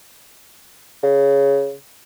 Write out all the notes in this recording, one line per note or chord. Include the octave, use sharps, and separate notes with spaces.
C#3